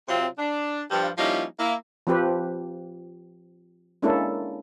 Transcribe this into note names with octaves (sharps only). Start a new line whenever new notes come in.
C3 F#3 C4 F4
D4
G2 F3
F3 G3 A#3 C#4 D#4 E4
A#3 E4
F3 C4 G4 B4
G#3 A#3 C#4 D4 E4 A4